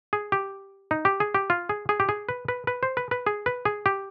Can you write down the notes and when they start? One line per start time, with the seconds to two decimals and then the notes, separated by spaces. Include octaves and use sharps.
0.13 G#4
0.32 G4
0.91 D#4
1.05 G4
1.20 G#4
1.35 G4
1.50 F4
1.69 G#4
1.89 G#4
2.00 G4
2.09 G#4
2.29 B4
2.48 B4
2.67 B4
2.83 C5
2.97 B4
3.11 B4
3.26 G#4
3.46 B4
3.65 G#4
3.86 G4